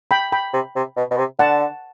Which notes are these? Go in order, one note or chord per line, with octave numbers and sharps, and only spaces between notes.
G5 B5
G5 B5
C3
C3
B2
B2
C3
D3 F#5 A5